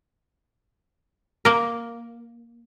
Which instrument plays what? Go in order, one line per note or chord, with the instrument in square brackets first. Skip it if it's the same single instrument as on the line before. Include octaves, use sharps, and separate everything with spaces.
[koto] A#3 A#4